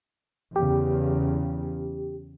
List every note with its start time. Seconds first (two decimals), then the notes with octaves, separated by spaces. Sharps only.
0.56 E2 C#3 G4